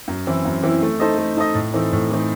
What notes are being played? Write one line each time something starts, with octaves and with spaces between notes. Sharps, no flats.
F#2
E3 C4 E4
F#2
E3 C4 E4
A3
D#4 A4 C5 D#5
A3
D#4 A4 C5 D#5
A2
E3 A3 C4 D#4
A2
E3 A3 C4 D#4